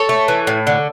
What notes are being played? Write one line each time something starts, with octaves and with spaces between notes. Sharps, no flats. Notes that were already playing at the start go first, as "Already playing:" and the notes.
Already playing: A4 C#5
A3
E3
A2
D3